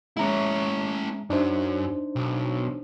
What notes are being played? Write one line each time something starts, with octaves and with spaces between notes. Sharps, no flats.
G#3 C#4 E4 E5 A#5
F#2 D4 D#4 C5
B1